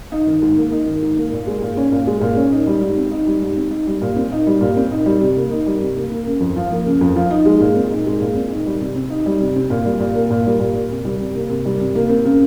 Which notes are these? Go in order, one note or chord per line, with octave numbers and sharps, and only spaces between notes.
D#4
D#3
G#2
A#3
D#4
D#3
G#2
A#3
A#2
G#3
A#2
C#4
A#2
G#3
A#2
C#4
D#4
G3
G#2
C4
D#4
G3
G#2
C4
D#4
G3
A#2
C4
D#4
G3
A#2
C4
D#4
G3
C3
A#3
D#4
G3
C3
A#3
A#3
C#3
F2
F3
A#3
C#3
F2
F3
D#4
G#3
A#2
C4
D#4
G#3
A#2
C4
D#4
G3
C3
C4
D#4
G3
C3
C4
A#2
G3
A#2
A#3
A#2
G3
A#2
A#3
C3
G3
C3
A#3
C3
G3
C3
A#3
C4
C#3